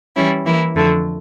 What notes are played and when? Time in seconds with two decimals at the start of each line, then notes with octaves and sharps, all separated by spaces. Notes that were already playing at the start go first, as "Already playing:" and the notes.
0.15 E3 G3 C#4 E4
0.45 E3 A#3 E4
0.76 F2 D3 A3